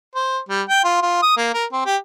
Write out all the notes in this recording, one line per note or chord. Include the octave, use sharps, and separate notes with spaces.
C5
G3
G5
F4
F4
D#6
A#3
A#4
C4
G4